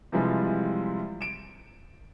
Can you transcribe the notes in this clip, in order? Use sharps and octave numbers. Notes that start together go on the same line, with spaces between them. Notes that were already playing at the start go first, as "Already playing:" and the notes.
C3 E3 F3 G3 G#3
D7 E7